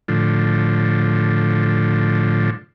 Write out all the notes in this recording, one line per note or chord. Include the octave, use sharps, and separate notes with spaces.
A2 D3 F3